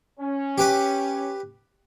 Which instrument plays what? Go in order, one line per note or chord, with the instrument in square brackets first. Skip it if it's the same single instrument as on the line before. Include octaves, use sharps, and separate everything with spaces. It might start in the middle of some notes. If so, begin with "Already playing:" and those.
[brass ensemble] C#4
[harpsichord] G4 B4 D6